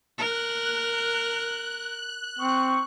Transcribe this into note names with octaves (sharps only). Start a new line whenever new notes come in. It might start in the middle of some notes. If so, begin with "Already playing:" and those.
A#4 F#6
C4 C#6